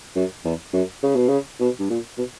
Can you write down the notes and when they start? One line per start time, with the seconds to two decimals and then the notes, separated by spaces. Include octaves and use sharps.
0.15 F#2
0.45 E2
0.73 F#2
1.03 C#3
1.16 B2
1.29 C#3
1.60 B2
1.79 G2
1.90 A#2
2.18 B2